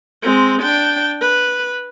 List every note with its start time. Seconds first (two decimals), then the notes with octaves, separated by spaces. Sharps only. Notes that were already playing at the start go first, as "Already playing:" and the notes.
0.22 G#3 C4
0.62 D4 G5
1.21 B4